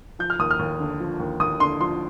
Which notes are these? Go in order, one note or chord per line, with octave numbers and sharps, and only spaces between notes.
F3 G6
F6
D#2 D#6
F6
D#2
D3
F3
D#2
D#2 D#6
D3 C6
F3 C6